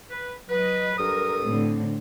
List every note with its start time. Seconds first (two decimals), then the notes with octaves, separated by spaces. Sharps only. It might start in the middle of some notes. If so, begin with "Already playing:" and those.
0.11 B4
0.50 F#3 B4 D#5
0.98 G2 A4 A#4 D#6
1.46 A2 D3 C4